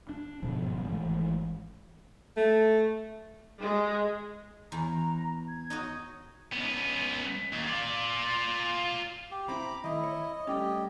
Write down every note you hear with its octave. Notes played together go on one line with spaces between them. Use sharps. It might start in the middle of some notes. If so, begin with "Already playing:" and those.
D4
G1 G#2 B2 F3
G#1 E3 G#3 A3
A3
G#3
E2 A#5
G#6
D#4 F#4 D#5
C#2 B3
D#2
F4 D5
G4
C3 C4 E4 A#5 B5 D6
A2 D#3 E4 D#5
C#5
G3 A3 C#4 G4